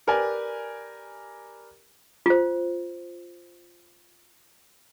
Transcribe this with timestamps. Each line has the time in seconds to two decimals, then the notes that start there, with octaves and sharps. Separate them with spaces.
0.07 G4 A#4 B4 D5 G#5
2.26 F4 C5